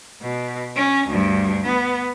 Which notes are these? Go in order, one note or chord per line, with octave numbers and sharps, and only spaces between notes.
B2
C#4
D2 G2
B3